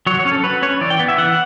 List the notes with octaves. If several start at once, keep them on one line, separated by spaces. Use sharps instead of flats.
F#3 C#5
C#5
C#4
A4
F#3 B4
C#4 C#5
E3 D5
G5
B3
E5
E3 F#5